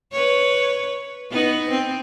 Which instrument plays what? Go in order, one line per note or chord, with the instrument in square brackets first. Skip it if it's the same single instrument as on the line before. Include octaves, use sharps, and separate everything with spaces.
[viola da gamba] B4 C#5
B3 D#4
C4